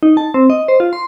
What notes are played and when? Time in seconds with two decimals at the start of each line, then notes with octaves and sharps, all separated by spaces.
0.03 D#4
0.17 A5
0.34 C4
0.50 D#5
0.68 C5
0.80 F4
0.93 C6